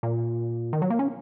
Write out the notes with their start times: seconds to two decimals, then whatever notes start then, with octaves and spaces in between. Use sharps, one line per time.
0.03 A#2
0.73 D#3
0.82 F#3
0.90 A#3
0.99 C#4